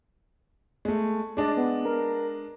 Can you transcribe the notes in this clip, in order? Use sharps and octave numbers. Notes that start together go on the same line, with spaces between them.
G#3 A3
G#3 D4 D5 D#5
B3
A#4